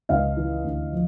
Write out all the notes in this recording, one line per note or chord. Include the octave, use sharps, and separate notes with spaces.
C#2 D#5 F5
E3
D2
F3